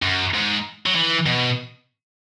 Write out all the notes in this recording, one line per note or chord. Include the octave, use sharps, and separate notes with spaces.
F#2
G#2
F#3
E3
B2